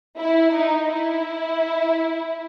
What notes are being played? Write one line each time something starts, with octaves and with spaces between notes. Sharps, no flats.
E4
D#4
E4